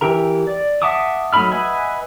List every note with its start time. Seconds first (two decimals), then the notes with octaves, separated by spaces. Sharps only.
0.01 E3 G4 A#4 A#5
0.47 D5
0.82 E5 F#5 A5 D6 D#6
1.33 F#3 A3 D#4 B5 F6
1.52 B4 D#5 E5 F#5 G#5